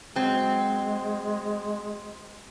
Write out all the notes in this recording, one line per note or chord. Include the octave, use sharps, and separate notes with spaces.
F#3 G#3 C4